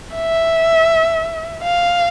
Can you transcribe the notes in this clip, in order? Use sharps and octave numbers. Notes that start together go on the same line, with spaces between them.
E5
F5